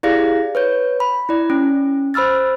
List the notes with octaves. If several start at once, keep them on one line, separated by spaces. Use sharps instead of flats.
E4 G4 G#4 D5 F5 A#6
B4 C#5 G6
B5
E4 D5
C#4
C5 B5 E6 F6 A6